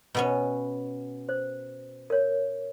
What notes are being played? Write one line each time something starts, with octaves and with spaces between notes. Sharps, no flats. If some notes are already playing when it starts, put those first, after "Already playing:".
B2 B3 C#4
C5
A#4 C#5